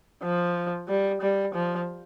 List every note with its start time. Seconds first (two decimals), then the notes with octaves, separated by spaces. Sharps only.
0.23 F3
0.88 G3
1.22 G3
1.54 F3